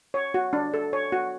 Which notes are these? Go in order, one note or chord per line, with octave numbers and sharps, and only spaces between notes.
C#5
F#4
D4
A4
C#5
F#4